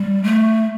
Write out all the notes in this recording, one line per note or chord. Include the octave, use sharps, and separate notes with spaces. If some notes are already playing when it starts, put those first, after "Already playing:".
Already playing: G3
A3